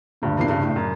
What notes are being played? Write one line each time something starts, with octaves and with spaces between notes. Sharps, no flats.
D2 G2 A#2
G2 C3 E3 A#3 B3 C7
G2 C#3
A2
F#2